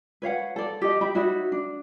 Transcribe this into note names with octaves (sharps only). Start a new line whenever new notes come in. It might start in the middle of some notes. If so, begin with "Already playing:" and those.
B4 C#5 F5 F#5
A4 D5
G4 D#5
G4 E5 B5
D#4 F#4 C#5 E5
D4